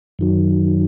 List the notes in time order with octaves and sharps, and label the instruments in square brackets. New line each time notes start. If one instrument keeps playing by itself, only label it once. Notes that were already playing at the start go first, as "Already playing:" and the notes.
[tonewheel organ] F#2 D#3 F#3